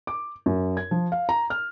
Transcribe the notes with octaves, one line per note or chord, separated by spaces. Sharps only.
D6
F#2
G#6
F3
F5
A#5
F6